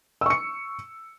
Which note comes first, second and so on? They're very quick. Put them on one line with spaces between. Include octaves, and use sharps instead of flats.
E6 C#6 C#7